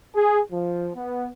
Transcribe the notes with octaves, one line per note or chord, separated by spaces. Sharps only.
G#4
F3
B3